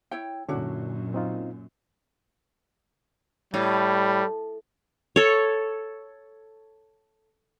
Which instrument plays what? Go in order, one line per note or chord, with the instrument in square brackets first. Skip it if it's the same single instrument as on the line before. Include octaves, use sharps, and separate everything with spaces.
[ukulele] E4 C#5 G5
[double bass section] F#2 A#2 [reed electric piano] D3 C#4 [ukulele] D4 E4 F#4
[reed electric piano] C4 D#4 F4
[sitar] A2 [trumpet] G3
[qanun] A4 C#5